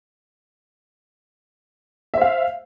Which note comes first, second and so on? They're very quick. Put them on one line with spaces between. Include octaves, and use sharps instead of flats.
E5 C5 F5